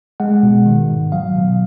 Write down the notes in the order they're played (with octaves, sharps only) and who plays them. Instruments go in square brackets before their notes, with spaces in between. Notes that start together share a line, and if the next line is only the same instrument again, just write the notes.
[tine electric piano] G#3 F#5
B2
D#3
G#2
F#3 F5
B2